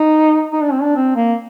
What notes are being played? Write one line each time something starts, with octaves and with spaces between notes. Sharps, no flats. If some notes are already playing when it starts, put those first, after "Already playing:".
Already playing: D#4
D#4
D4
C4
D4
C4
A#3